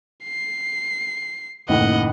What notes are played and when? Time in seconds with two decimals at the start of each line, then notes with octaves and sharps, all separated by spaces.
0.24 C7
1.69 F#1 D#2 A2 D#5 F#5